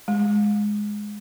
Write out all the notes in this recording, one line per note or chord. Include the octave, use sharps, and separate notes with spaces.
G#3